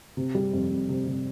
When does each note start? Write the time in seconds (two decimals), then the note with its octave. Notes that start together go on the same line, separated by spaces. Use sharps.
0.17 C3
0.35 G3
0.53 F2
0.71 F2
0.89 C3
1.07 C3